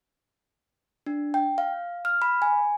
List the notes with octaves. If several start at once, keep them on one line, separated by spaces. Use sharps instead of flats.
D4
G5
F5
F6
B5
G#5